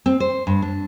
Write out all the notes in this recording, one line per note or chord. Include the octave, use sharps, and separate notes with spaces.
C4
C5
G2
D4